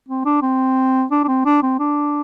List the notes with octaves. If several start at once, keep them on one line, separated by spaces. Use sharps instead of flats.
C4
D4
C4
D4
D4
C4
D4
C4
D4